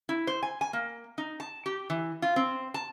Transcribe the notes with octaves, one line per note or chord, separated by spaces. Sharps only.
E4
C5
G#5
G#5
A#3
D#4
A5
G4
E3
F4
C4
A5